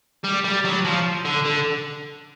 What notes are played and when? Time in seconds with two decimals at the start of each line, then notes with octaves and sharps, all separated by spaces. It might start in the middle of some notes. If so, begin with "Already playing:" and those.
0.24 G3
0.45 G3
0.65 F#3
0.85 F3
1.25 D3
1.45 D3